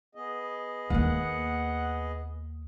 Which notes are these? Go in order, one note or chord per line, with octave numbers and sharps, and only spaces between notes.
B3 G#4 D#5
D#2 A#3 F#5